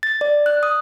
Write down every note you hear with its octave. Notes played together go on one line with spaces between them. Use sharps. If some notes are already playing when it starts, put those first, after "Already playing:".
A6
D5
F#6
D#6